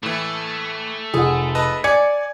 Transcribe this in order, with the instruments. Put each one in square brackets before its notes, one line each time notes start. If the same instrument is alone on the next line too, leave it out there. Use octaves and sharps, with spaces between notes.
[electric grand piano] A2 E3 [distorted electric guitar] A3
[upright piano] F1 F#5 [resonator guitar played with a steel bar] G#4
[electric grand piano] B4 D#5 A5
[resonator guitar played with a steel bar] D5 [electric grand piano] G#5 G#6 [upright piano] C#7